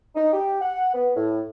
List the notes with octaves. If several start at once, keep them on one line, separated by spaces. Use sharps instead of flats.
D#4
G4
F#5
B3
A2